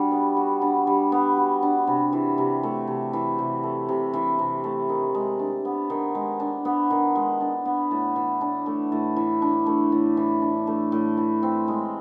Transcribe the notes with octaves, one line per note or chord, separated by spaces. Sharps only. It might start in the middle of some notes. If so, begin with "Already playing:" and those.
Already playing: G3 D4 F#4
B3
F#4
D4
G3
B3
F#4
D4
C3
E3
C3
A3
C3
E3
C3
A3
C3
E3
C3
A3
D#3
G#3
D4
B3
D#3
G#3
D4
B3
D#3
G#3
D4
B3
A2
E3
D4
A3
A2
E3
D4
A3
A2
E3
D4
A3
A2
E3
C4
G#3